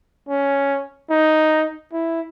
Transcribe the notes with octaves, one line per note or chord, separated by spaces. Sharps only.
C#4
D#4
E4